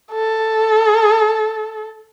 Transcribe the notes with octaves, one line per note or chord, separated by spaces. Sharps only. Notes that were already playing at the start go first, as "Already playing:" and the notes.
A4